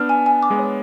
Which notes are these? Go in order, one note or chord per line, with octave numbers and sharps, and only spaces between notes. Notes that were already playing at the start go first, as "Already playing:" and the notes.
Already playing: B3 D4 F6
G#5
G#5
D6
G#3 B3
C#5